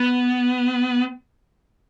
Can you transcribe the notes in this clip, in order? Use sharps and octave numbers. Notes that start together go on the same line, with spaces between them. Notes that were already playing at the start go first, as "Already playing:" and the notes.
Already playing: B3